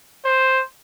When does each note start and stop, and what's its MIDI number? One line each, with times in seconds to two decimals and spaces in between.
0.25 0.61 72